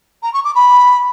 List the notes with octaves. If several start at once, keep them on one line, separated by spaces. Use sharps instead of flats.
A#5
C#6
D6
B5